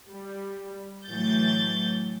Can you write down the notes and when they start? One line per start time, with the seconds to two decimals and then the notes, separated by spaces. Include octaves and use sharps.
0.11 G3
1.08 A2 E3 F#3 G6 A6